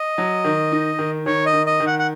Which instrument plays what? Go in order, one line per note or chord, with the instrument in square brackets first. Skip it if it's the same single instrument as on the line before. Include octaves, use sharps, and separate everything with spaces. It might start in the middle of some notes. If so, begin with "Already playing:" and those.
Already playing: [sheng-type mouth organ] D#5
[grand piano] F#3
D#3
D#4
D#3
[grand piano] D#3 [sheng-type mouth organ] C#5
[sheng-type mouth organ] D#5
[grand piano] D#3
[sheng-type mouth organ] D#5
[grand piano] D#3
[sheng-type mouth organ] F#5
F#5